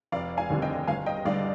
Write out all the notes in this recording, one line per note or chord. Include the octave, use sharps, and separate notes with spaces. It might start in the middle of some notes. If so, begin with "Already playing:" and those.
F1 D5 F5
F5 G#5
D#2 D3 G3 C4
D#5 G5
G1 F5 G#5
D#5 G5
G2 D3 D5 F5